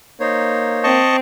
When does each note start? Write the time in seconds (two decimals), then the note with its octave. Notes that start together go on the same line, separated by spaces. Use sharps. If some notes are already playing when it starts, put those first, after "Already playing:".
0.20 A#3 D#4 C5 C#5
0.84 C4 D#5 A5 C#6